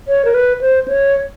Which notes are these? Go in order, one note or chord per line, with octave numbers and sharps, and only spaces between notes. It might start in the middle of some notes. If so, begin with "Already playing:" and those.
C#5
A#4
B4
C5
C#5